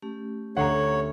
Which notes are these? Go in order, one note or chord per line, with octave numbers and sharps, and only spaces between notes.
A3 C#4 G4
D2 C#5 F#5 A#5 C6 C7